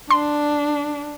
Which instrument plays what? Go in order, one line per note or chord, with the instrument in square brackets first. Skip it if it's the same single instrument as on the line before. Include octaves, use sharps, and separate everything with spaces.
[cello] D4 [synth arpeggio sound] C6